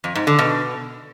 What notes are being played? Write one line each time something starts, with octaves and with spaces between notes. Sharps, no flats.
F2
G#2
D3
B2